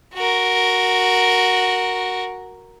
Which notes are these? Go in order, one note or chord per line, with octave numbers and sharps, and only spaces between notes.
F#4 A#4